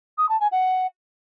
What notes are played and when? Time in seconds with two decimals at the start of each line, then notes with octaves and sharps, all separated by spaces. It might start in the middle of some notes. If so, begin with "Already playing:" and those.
0.18 D#6
0.29 A5
0.40 G#5
0.52 F#5